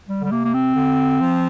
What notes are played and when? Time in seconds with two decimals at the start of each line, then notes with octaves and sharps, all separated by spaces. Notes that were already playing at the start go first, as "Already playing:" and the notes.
0.08 G3
0.21 D3 G3
0.31 C3 A#3
0.45 A#3
0.54 C4
0.75 D3
1.21 F3